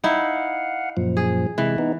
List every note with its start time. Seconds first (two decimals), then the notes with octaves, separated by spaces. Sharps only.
0.04 D#4 E4 F5 F#5
0.97 F#2 A#2 F3
1.17 G#4
1.58 C3 E3 G#3
1.78 B3 D#4